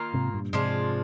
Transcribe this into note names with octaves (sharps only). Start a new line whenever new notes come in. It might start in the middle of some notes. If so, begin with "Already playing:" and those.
Already playing: D#3 A#3 F4
G#2 C3
G2 A#2
G#2 C3 F3 G#3 D4 F4